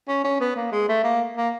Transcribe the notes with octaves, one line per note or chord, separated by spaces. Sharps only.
C#4
C#4
B3
A#3
G#3
A3
A#3
A#3